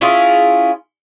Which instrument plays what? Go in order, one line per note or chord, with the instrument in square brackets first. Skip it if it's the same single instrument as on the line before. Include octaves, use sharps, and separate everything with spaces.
[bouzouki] C#4 E4 F4 G#4